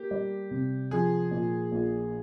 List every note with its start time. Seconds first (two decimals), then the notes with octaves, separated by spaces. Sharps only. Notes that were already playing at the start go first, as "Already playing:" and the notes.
Already playing: A#3 G4
0.11 G3
0.51 C3
0.91 F3 G#4
1.31 A#2
1.72 A#1